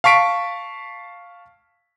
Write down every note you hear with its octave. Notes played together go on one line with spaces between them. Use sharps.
F5 A5 C#6 B6 D7